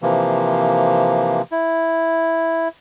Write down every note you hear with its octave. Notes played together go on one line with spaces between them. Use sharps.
C3 E3 F3 A#3
E4